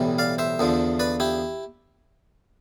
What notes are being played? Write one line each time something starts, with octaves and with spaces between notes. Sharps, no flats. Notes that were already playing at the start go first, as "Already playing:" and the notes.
Already playing: B1 A2 E3 G3
D5 F5
C5 E5
E2 D3 F3
B4 D5
E4 G4